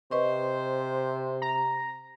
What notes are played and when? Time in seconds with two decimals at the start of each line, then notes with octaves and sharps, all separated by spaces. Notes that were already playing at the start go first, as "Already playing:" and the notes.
0.11 C3 B4 C5 D#5 C#6
1.42 A#5